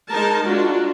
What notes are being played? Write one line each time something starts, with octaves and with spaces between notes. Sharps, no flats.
G#3 D#4 A#4 A5
G#3 D4 F4 F#4